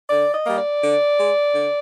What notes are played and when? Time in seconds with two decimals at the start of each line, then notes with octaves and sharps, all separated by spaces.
0.09 D3 D5
0.34 D#5
0.45 G3 A#3
0.57 D5
0.82 D3
1.17 G#3
1.53 D3